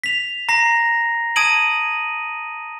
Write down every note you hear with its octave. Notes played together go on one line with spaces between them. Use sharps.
B6 F7
A#5 A#6 C7
A5 D#6 G#6 D7 D#7 F#7